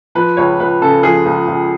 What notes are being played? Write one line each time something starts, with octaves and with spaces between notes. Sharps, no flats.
F3 B4
C#2 C#5
C#2 B4
C#3 A4
F3 G#4
C#2
C#2